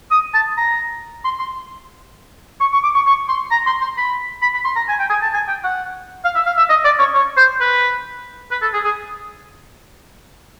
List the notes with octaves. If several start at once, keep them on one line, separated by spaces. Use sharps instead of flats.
D#6
A5
A#5
C6
C6
C#6
C#6
D6
C#6
C#6
C6
A#5
C6
C6
B5
B5
B5
C6
A#5
G#5
G5
G#5
A5
G#5
G5
F#5
F5
E5
F5
E5
D#5
D5
C#5
C#5
C5
B4
B4
A4
G#4
G#4